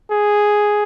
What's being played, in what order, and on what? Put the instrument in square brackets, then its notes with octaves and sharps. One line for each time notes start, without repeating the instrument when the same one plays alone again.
[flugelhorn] G#4